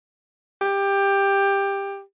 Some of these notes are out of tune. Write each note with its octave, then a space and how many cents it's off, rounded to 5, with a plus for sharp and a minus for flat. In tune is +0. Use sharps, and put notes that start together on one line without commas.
G4 +15